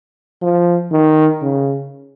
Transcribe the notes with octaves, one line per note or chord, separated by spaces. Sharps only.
F3
D#3
C#3